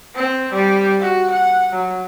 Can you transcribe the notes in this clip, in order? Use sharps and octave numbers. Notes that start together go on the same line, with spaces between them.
C4
G3
F#4
F#5
F#3